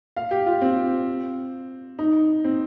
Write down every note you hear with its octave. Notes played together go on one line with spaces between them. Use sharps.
F5
G4
F4
C4
D#4
C4